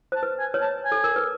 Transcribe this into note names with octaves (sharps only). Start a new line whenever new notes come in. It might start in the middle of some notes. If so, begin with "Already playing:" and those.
C5 A5
B4
G#5
B4 C#5
A5
G#5
A4
A#4
B4